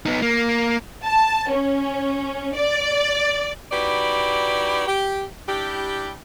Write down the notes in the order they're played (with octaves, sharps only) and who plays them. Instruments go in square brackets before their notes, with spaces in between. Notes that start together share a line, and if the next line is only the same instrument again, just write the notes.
[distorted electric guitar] B3 D#4
A#3
[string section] A5
C#4
D5
[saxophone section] D#4 E4 F#4 G4 B4 D5
G4
G3 D4 E4 G4